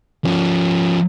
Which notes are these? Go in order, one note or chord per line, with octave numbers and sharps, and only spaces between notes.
F3 C#4